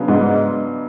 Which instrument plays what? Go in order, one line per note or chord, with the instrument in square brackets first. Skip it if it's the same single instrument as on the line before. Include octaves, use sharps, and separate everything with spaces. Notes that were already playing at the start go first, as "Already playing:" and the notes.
Already playing: [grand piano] C#3 F#3 B3 D4
[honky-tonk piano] G#2